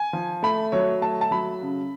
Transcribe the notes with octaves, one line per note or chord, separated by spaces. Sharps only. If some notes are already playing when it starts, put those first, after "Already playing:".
Already playing: G#5
F3
A3 B5
F#3 C#5
A3 A5
A5
F#3 B5
C#3